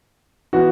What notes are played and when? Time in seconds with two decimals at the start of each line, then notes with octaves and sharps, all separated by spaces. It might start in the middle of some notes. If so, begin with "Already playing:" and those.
0.53 E3 B3 F#4